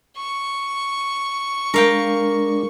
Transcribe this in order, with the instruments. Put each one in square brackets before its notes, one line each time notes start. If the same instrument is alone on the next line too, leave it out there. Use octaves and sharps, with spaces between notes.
[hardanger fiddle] C#6
[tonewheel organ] G#3 D4 [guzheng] A#4 F5 G5